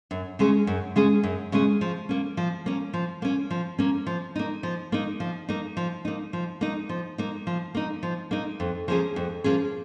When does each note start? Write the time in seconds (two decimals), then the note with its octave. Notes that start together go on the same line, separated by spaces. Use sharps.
0.11 F#2
0.39 C#3 G#3 C#4 G#4
0.67 F#2
0.96 C#3 G#3 C#4 G#4
1.23 F#2
1.52 C#3 G#3 C#4 G#4
1.81 F3
2.09 A#3 C#4
2.37 F3
2.66 A#3 C#4
2.93 F3
3.22 A#3 C#4
3.50 F3
3.79 A#3 C#4
4.07 F3
4.35 A#3 D#4
4.63 F3
4.92 A#3 D#4
5.20 F3
5.48 A#3 D#4
5.77 F3
6.05 A#3 D#4
6.33 F3
6.61 A#3 D#4
6.89 F3
7.18 A#3 D#4
7.47 F3
7.75 A#3 D#4
8.03 F3
8.31 A#3 D#4
8.60 F2
8.88 F3 A#3 C#4 G#4
9.16 F2
9.44 F3 A#3 C#4 G#4